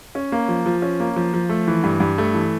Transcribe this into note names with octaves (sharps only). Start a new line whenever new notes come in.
C#4
A#3
F3
F3
C#4
A#3
F3
F3
A3
E3
G2
G2
A3
E3